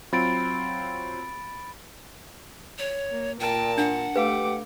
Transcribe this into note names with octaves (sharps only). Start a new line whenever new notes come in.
F#3 C4 F4 B5 A6 D7
C#5
A#3
A#2 A#4 G5 A5
D4 F#5
A3 G4 B4 F5 D6